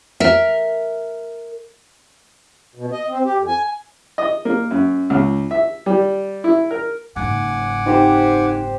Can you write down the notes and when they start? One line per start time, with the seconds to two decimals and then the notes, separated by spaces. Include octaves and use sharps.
0.20 A#4 E5
2.75 B2
2.92 D#5
3.08 C4
3.24 G4
3.36 F2
3.48 G#5
4.18 D#5
4.45 A#3
4.71 F#2
5.10 C#2
5.51 E5
5.86 G3
6.44 E4
6.71 A#4
7.16 F#1 G#2 F#5 G#5 D6
7.86 C4 D#4 G4 C5